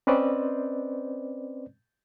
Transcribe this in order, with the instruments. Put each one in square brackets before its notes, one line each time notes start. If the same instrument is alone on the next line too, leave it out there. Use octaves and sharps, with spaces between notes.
[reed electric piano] C4 C#4 B4 C5 D5 D#5